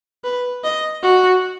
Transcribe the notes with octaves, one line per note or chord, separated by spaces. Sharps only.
B4
D#5
F#4